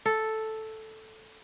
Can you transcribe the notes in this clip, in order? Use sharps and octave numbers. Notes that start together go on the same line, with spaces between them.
A4